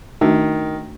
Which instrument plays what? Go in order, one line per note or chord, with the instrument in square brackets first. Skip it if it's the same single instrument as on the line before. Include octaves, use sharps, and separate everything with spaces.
[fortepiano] D#3 [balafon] A3 D4 F#4